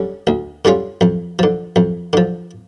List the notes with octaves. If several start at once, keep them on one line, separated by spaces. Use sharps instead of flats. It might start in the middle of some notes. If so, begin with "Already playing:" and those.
Already playing: D3 G3 C#4
D2
D3 G3 C#4 F4
F2
D3 F3
F2
D3 F3